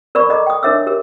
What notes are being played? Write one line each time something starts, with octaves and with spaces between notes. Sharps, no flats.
A#4 D5 B5 C#6
A4 D#5 A#5 D6
G5 D#6
D4 A#4 C#5 E5 D6 E6
G4 A#4